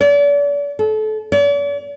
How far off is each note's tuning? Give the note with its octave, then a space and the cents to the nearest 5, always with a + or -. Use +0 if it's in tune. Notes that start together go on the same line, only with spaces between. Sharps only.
D5 -40
A4 -30
D5 -45